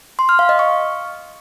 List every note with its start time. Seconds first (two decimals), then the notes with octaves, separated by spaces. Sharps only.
0.19 C6
0.29 F6
0.39 F5
0.49 D#5
0.59 C#6